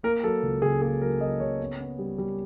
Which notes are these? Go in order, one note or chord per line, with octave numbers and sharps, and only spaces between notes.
A#3 A#4
F#3 A4
C#2
C#3 G#4
A#3 G#4
F#3 A#4
F#3 D#5
C#3 C#5
B3
B3
G3
G3